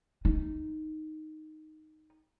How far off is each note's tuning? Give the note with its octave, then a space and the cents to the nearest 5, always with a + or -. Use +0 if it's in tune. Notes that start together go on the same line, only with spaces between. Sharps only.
D#4 -5